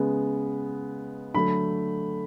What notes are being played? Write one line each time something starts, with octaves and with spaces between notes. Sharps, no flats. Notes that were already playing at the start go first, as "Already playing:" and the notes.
Already playing: C#3 G#3 B3
D3 F#3 A3 B5